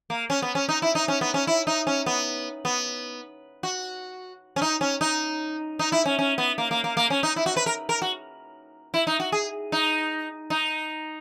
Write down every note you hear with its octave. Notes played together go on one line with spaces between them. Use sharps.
A#3
C#4
B3
C#4
D#4
E4
D#4
C#4
B3
C#4
E4
D#4
C#4
B3
B3
F#4
C#4
D#4
C#4
D#4
D#4
E4
C#4
C#4
B3
A#3
A#3
A#3
A#3
C#4
D#4
E4
F#4
B4
A#4
A#4
F#4
E4
D#4
F#4
G#4
D#4
D#4